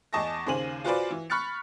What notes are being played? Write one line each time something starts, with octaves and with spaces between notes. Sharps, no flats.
E2 G#4 D#5 A5 C#6 A#6
D#2 C#3 C5 G#5 F#7
F4 F#4 G#4 B4 C5 D5
E3
B5 C#6 F6 F#6 A6 C#7